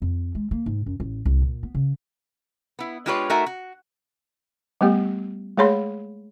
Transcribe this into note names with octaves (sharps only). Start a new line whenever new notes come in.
F2
G#3
A#3
G#2
F#2
A1
C2
A#2
B3
C#3
B3 E4
G#3 D4 F4 G4 B4 C#5
A3 D#4 F#4 A#4 E5 G#5
F#4
G3 A3 B3 G4
G#3 A3 G#4 C#5 B5 C6